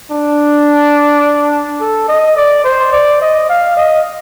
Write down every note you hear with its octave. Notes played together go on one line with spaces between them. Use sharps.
D4
A4
D#5
D5
C5
D5
D#5
F5
D#5